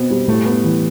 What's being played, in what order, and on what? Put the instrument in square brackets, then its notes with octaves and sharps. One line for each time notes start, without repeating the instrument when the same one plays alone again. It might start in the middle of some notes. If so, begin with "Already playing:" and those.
Already playing: [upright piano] B2 C4 [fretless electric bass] B3
[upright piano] G3
[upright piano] A2 [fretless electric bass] A3
[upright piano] B3
E3